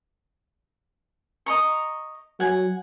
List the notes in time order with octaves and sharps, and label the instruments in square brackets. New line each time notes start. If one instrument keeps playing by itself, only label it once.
[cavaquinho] D#5 A#5 C#6
[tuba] F#3 [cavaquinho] F#5 G#5